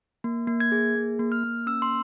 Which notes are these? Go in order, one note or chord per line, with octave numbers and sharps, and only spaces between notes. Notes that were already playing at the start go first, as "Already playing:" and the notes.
A#3
A#3
G#6
G#4
A#3
A#3
F6
A#3
C#4 E6
C6